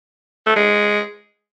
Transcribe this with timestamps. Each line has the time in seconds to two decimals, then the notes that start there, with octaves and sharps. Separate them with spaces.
0.47 A3
0.56 G#3